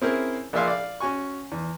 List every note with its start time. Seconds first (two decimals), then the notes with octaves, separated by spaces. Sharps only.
0.02 C4 C#4 E4 G#4 A#4 C5
0.53 A#1 A#2 G#4 E5 F5 C6
0.68 D5 F5
1.00 C#4 F#4 G#5 C#6
1.52 E2